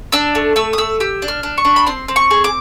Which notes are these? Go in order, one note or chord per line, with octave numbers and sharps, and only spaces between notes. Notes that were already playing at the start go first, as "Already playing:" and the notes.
D4 E6
A3
A3 E6
D#6
A3 E6
G4 E6
D4
F6
D4
C#6
D4
B5
C4 C6
C4
C#6
G#4
D6